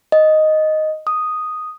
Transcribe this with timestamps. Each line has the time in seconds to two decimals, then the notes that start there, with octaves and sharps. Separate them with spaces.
0.12 D#5
1.07 D#6